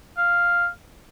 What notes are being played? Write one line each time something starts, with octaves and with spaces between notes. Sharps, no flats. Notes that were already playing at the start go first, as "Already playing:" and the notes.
F5